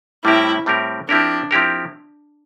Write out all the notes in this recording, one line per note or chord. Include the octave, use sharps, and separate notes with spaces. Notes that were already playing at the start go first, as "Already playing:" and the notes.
A2 G3 C4 E4 G4 A#4
A2 G3 C4 G4 A#4
F3 C4 D4 E4 G4 A#4
F3 C4 E4 G4 A#4